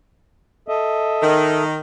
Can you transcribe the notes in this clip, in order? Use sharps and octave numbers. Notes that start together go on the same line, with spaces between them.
A4 D#5 E5
D#3